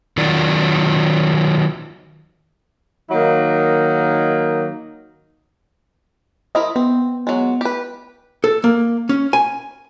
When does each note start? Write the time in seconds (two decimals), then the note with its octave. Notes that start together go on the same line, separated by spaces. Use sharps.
0.17 D#3 F#3 F4 D5
3.11 D#3 F#3 A#3 D#4
6.55 F3 E4 A#4 D#5
6.76 B3 C4
7.27 F#3 G#3
7.61 G4 B4
8.44 A4
8.64 A#3
9.09 C#4
9.33 G#5